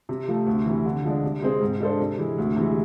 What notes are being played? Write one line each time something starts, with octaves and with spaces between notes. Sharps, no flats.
C3
F3 A3
D2
C3 E3
D3
F3 G#3 D4
C3
G#3 C4 G#4 C5
G#2
G#3 D4 A4 C5
C3
E3 G#3
D2
C3 E3 G#3